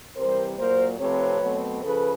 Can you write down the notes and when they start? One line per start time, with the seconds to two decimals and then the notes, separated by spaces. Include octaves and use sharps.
0.17 C3 E3 G3 A#4 C5
0.58 A#2 F#3 A#3 A#4 C5
1.00 C3 F3 A3 C4 B4 C#5
1.42 B2 F#3 A3 C4
1.83 C#3 F3 A4 B4